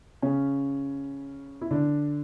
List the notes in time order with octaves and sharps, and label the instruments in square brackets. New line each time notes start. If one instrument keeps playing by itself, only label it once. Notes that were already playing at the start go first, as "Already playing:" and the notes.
[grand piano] C#3 C#4
E4
D3 D4